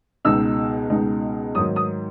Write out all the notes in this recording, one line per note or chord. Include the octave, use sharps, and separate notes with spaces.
C#2 B2 G#3 D#4 E6
C#2 B2 G#3 D#4
G#2 D#3 F#3 D#6
D#6